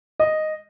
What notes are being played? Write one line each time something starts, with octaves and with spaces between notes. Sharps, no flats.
D#5